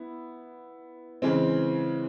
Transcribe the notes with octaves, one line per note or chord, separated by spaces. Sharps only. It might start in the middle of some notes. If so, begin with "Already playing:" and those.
Already playing: B3 E4
C#3 E3 G#3 C4